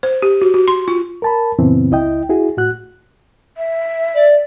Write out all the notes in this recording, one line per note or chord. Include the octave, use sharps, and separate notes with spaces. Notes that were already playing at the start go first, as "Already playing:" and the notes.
C5
G4
F#4
F#4
C6
F4
A#4 A5 B5
F#2 A#2 C#3 E3 B3 C4
C#2 E4 D#5 G5
E4 F#4 G#4
A2 F#4 F#6
E5
D5